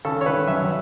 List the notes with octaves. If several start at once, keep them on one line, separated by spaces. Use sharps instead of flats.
C#3 A4
C#5
C#3 B4
F#2 E5